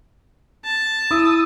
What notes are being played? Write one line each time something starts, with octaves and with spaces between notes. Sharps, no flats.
A5
E4 D#6 E6